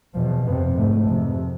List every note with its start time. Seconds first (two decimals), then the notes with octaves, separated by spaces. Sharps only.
0.14 E2 B2 F3
0.46 F2 C3 B3
0.77 G#2 A3
1.08 F2 C3